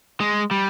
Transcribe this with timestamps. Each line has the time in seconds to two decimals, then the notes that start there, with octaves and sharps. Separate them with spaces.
0.20 G#3
0.51 G3